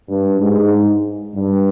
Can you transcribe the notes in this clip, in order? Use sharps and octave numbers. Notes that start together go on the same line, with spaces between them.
G2
G#2
G2